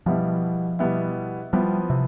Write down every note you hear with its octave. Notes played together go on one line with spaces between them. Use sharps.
B2 F3 G3 B3 E4
B2 G3 B3 E4
F3 G3 B3 E4
C3